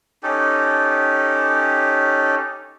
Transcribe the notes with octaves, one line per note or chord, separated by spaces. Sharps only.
C#4 D#4 G4 A4